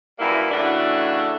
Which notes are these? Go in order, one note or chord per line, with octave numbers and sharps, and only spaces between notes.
F#2 E3 G3 A#3 E4
A2 C#3 E3 D4 F#4 A4